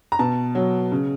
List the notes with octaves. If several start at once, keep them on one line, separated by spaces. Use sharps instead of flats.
A#5
B2 A5
F#3
C#3